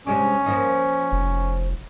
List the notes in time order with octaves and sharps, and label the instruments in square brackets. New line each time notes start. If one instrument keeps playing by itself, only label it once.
[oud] C3 G#3 D4 [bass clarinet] C#4
[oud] F3 A#3 D#4
[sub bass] F1